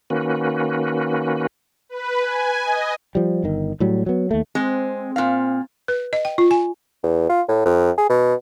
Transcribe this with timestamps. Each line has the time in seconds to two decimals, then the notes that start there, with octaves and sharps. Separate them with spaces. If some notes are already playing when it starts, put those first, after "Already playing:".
0.10 D#3 A#3 C#4 F#4 B4
1.89 B4
2.21 G#5
2.65 D#5
3.15 F3 G3
3.44 G1 D#3
3.80 A2 F#3 G3
4.06 F#3 B3
4.31 D#2 A3
4.55 G#3 C4
5.16 A#2 F5
5.88 B4
6.13 D#5
6.25 G5
6.38 F4
6.51 G#5
7.04 E2
7.30 F4
7.48 A2
7.66 F2
7.98 G#4
8.09 B2